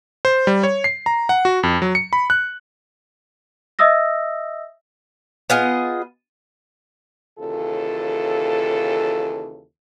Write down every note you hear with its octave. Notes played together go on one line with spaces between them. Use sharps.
C5
G3
C#5
C7
A#5
F#5
F#4
F2
F#3
C#7
B5
F#6
D#5 E5 D#6 E6 A#6
B3 F4 G#4 D#5
D#2 C#3 E3 F4 A4